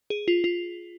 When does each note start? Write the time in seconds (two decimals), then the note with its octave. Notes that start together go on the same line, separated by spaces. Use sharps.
0.10 G#4
0.28 F4
0.44 F4